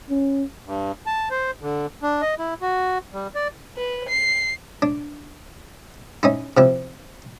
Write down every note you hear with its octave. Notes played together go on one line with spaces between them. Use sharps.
C#4
G2
A5
C5
D3
D4
D#5
E4
F#4
G3
D5
B4
C7
D4
C#4 D#4 E4
C3 F3 E4